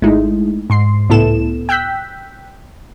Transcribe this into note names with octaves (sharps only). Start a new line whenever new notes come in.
G#1 G#3 A3 D#4 E4
G#2 C6 C7
C#2 A2 B3 E4 A4 E7
G5 E6 F#6 G6 B6